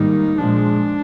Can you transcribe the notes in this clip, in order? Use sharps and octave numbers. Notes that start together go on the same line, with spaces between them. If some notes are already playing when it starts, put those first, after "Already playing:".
Already playing: G#2 D#3 G3 A#3 D#4
A#2 F3 G#3 D4